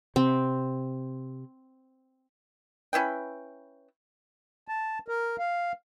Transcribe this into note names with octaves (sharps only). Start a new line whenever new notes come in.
C3 C4
C#4 E4 B4 G5
A5
A#4
F5